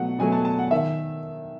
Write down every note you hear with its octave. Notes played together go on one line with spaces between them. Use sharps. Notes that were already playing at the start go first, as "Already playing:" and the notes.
Already playing: B2 F#3 A3 F#5
B2 F#3 A3 G#5
A5
A5
F#5
D#3 E5